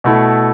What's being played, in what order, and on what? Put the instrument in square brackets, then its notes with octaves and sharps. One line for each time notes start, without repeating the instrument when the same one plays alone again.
[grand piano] B2 A3 E4 A4